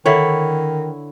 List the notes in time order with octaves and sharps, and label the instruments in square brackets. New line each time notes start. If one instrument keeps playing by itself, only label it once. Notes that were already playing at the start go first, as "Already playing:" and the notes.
[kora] D3 E4 C#5 [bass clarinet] D#3